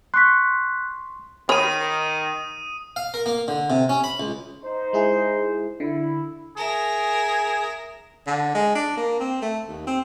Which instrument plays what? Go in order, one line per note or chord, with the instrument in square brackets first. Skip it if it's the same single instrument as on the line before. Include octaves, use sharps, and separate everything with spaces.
[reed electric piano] C6 C#6 [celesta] F#6 B6
[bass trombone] D#3 [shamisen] A#4 C#5 B5 [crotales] D#6 D#7
[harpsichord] F5
A#4
A#3
D3
C3
C#4
B5
C#2
[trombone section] D#4 C5
[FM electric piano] G#3 E4 G#4
[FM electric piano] D3 [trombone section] E4
[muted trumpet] G#4 [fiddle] A#4 E5
[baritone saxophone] D3
G#3
D4
A#3
C4
A3
D#2
C4